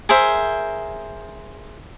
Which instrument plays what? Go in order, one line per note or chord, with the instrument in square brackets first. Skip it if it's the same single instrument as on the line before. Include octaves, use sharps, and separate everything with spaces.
[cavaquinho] G#4 A#4 C5 E5